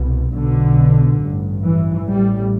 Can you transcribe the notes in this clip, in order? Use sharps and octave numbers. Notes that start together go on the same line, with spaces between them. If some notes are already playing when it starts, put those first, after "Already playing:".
Already playing: C2 B2
B1 B2 D3
A1 G2
E3
A1 A2 G3